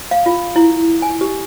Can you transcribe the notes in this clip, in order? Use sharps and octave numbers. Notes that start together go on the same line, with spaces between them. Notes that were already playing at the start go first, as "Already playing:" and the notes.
F5
F4
E4
G#5
G4